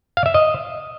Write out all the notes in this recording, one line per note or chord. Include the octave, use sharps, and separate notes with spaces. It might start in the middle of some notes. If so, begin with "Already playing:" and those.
F5
E5
D#5